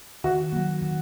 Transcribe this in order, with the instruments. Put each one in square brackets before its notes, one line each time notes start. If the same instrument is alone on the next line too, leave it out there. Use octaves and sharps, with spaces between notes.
[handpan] D#3 [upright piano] F#4
[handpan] F#3 A#3
D#3